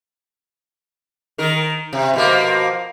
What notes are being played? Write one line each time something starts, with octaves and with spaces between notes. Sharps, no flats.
D#3 A#4
C3
B2 F3 A#3